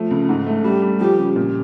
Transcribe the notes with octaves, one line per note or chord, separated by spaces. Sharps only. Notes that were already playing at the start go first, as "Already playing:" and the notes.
Already playing: F3 A3
C#2
G#2
A3
G3 G4
G3
F3 G4
C#3
A#2